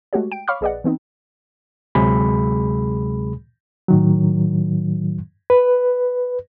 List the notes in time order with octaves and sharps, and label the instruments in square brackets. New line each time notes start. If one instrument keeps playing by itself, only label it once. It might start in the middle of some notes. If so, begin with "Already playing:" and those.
[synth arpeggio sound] G#3 A3 F#4 G4 C#5
G5 D7
C#5 F5 B5 C#6 D6 F6
A#1 G#4 B4 D5 D#5 F#5
E3 B3 C4 D#4
[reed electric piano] D2 C3 F#3 G#3 G#4 B5
A2 D#3 F#3
B4